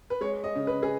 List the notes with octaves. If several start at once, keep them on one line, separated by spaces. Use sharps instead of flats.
B4
G#3 C#5
D#5
C#3
B4
G#4